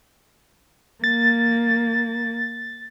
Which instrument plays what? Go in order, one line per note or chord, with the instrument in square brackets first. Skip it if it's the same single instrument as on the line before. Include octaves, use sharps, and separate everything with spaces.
[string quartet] A#3 [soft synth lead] A6